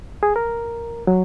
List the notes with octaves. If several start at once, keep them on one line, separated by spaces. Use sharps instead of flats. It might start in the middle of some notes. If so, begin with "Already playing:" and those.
G#4
A#4
F#3